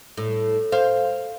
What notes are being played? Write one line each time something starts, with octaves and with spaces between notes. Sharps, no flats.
A2
C5 F5